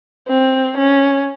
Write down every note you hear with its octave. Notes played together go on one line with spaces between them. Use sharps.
C4
C#4